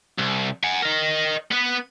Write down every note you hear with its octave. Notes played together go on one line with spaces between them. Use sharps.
C2
F#5 G#5
A#4 D#5
B3 B4